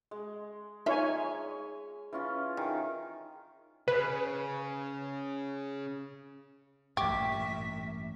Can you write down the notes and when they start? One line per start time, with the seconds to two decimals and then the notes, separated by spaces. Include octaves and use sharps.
0.11 G#3
0.86 D#4 F4 C#5 E5 G#5
2.13 E3 C#4 F4
2.57 D#3 G#4
3.88 C#3 B4
6.97 A1 G2 A#2 G4 E5 C#6 D6